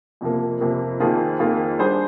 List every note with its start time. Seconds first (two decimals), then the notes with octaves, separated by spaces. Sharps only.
0.21 F2 C3 F3 A#3
0.60 F2 C3 F3 A#3
1.00 F2 D#3 A#3 F4 G#4
1.39 F2 D#3 A#3 F4 G#4
1.79 G3 D4 G#4 C5